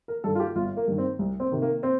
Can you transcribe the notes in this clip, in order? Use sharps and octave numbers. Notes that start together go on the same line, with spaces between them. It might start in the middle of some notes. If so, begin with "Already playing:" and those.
A#4
G2 D#3 A4
F4
G4
G1 F4
A#3
G2 D#3
C4
C2
C4
C3 D#3
A#3
C4